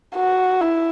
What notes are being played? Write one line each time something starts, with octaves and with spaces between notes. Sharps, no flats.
F#4
E4